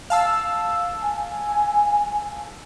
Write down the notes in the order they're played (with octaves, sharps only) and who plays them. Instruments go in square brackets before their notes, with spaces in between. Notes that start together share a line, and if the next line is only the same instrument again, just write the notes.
[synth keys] F5 A5 E6
[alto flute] G#5